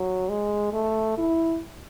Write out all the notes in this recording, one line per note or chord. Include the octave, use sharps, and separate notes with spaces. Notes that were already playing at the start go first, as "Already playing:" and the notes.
Already playing: F#3
G#3
A3
E4